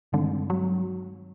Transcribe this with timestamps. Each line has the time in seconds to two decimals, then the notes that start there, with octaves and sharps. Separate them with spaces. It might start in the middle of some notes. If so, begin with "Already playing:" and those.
0.13 G2 D3 D#3 G#3 C4
0.50 F#3